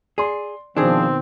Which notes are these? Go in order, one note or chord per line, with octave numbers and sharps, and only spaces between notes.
G#4 D5 C6
B2 D#3 F3 C4 D4 G#4